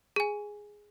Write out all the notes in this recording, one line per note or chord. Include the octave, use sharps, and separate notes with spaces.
G#4 G#5